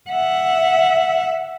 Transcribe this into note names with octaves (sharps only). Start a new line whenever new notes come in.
E5 F#5